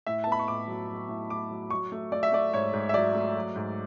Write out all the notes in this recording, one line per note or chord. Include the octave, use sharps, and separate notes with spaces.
A2 E5
A5
B3
B5
C#6
A2 D6
F#3
F#3
A2
A2 D6
F#3
F#3 C#6
A3
A3 D5
E5
A3 D5
G#2 C#5
G#2
E5
F#3 D5
A3
F#3
G#2